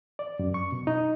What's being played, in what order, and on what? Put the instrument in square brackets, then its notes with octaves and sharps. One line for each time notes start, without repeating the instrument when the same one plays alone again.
[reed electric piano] D5
F#2
C#6
B2
D#4